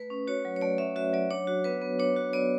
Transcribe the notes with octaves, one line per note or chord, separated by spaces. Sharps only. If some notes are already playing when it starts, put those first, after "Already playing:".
Already playing: A3 B4
C#4
F#4 C#5
F#3
C#5
A3 D5
C#4 E5
F#4 E5
F#3 D5
D4 C#5
F#4
B3 B4
B3
D4 C#5
F#4
B3 D5